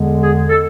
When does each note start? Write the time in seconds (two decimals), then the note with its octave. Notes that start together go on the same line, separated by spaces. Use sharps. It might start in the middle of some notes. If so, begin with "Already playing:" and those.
Already playing: E2 D3 G#3
0.21 G#4
0.49 A4